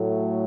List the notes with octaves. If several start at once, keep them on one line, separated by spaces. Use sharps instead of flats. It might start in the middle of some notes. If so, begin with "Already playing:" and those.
Already playing: A2 F#3 A3